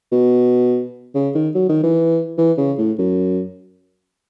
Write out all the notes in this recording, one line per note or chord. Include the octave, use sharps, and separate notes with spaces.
B2
C#3
D#3
F#3
D#3
E3
E3
C#3
A2
F#2